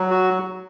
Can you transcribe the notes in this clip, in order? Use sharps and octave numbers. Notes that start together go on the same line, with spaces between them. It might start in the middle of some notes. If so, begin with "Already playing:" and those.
Already playing: F#3
F#4